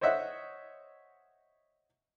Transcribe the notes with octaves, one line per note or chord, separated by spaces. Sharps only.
C5 C#5 D#5 E5 F#5